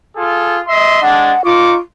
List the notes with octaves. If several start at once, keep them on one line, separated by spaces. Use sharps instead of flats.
F4 G#4 A4
D#5 E5 C6
G#3 D4 F#5
D#4 F4 C#6 D6